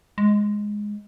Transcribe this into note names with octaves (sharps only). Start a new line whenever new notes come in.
G#3